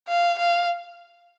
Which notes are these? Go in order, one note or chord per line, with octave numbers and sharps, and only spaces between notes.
F5
F5